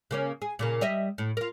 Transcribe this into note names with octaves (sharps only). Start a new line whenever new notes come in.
C#3 A#3 C#4
G#4
A#2 C#3 A#3
G3 D#5 E5
A2
F4 A#4